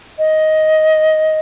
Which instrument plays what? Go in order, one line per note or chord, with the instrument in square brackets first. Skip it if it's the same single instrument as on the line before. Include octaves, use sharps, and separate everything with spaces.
[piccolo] D#5